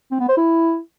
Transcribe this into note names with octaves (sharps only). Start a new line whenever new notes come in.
C4
B3
C5
E4